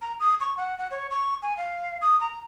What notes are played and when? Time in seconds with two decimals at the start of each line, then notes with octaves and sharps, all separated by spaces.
0.02 A#5
0.20 D#6
0.40 C#6
0.57 F#5
0.78 F#5
0.91 C#5
1.11 C#6
1.42 G#5
1.57 F5
2.01 D#6
2.21 A#5